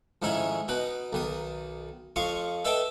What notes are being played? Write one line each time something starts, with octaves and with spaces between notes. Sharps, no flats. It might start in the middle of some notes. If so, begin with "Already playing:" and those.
F2 G#2 D#3 C#4 E4
B2 D#4 B4
B1 D#3 D#6
F2 F4 F5 C#6 D#6
A4 B4 D#5 E5 G5 A5